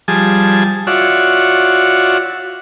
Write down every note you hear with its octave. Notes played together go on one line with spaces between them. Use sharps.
F3 G3 G#4 G#5 A5 D#6
F4 F#4 C#5 D5 E5 F#5